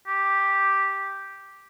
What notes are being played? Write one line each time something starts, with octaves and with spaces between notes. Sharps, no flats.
G4